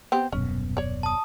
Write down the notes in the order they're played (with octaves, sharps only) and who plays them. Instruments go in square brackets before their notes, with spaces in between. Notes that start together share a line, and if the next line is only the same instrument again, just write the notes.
[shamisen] B3 C4 G4
[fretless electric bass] D#1 F#2 B2 [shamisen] C#4
[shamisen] C#5 D5
[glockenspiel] A5 D#6